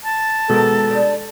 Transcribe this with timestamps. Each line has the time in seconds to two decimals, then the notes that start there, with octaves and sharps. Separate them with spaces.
0.04 A5
0.49 B2 D#3 G#3 A4 A#4
0.90 G3 D4